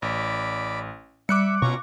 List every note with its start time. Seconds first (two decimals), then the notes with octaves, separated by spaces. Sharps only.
0.02 A1 D5 B5
1.29 G3 E5 D6 F#6 C#7
1.62 B2 C#4 F4 A#5 C#6